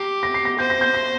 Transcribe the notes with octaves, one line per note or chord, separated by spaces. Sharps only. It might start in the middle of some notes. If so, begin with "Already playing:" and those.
Already playing: G4 C7
A#6
C7
A#6
C5 G6
A#6
G6
A#6